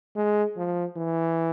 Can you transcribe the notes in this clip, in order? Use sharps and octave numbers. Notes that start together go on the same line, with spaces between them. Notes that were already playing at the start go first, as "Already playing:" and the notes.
G#3
F3
E3